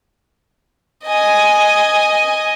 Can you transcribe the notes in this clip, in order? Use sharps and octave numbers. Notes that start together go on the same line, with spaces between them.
D#5 G#5